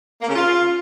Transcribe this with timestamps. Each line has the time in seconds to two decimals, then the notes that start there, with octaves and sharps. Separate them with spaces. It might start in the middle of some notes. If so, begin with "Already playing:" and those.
0.21 A#3
0.28 C#3
0.35 F4